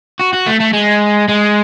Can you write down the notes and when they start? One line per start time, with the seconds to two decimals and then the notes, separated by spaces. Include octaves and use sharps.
0.19 F#4
0.33 F#4
0.46 A3
0.60 A3
0.73 G#3
1.28 G#3